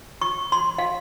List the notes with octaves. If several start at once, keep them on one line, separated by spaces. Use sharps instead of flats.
C#6
C6
F5